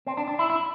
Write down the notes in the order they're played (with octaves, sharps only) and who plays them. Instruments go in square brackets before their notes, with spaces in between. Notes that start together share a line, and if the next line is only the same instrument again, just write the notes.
[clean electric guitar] C4
D4
D4
E4
E4